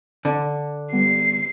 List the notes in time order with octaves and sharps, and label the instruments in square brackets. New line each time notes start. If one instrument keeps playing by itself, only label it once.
[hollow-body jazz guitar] D3
[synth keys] G3 B3 [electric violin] C7